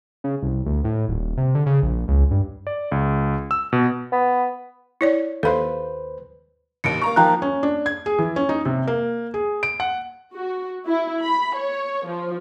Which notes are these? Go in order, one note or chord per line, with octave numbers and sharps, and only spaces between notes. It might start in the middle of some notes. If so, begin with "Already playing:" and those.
C#3
C2
D2
A2
D#1
C3
D3
C#3
A#1
C#2
G2
D5
C#2
E6
B2
B3
E4 C#5 D5
D#2 A4 B4 C5 F5
A1 D#2 C#7 D7
A#3 A#5 C#6
D#3 F3 A#3 G5 A#5 F#6
C#4
D4
G#6
G#4
E3
C#4
D#4
C3
A#3
G#4
D7
F#5
F#4
E4
B5
C#5
F3